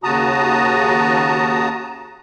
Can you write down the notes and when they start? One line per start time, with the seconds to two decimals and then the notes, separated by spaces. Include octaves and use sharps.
0.04 D#2 C#3 F#4 A5 A#5 D#6